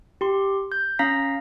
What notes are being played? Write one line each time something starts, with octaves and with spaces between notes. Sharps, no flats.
G4 C6
G6
C#4 F5 A#5 A#6 B6